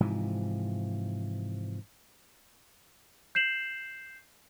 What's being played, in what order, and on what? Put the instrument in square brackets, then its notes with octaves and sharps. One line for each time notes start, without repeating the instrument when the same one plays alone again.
[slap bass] G#2 C3 E3 F3
[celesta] G6 C7 E7 F#7